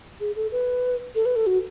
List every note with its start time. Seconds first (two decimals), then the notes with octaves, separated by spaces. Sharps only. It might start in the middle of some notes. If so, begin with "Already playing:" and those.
0.20 G#4
0.36 A4
0.52 B4
1.15 A4
1.26 B4
1.36 A4
1.47 F#4